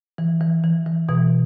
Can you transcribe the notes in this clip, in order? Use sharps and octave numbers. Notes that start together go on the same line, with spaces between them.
E3
E3
E3
E3
B2 E3